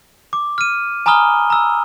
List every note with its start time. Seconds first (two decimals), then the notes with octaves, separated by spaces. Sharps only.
0.33 D6
0.58 F6 D#7
1.06 G#5 A#5 B5 D#6 F6 G7
1.50 A#5 E6